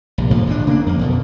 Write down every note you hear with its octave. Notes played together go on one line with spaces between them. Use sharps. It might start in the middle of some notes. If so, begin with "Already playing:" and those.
A#1 C3
G2 A#2 D3 F3
G1 A2 C3 D4
C#3 A#3 C#4 D4
F2 A#3
E2 B2 D3